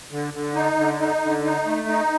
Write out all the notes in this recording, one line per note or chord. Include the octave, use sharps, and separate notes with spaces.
D3
D3
D#4
D3
D#4
D3
D#4
A3
D#4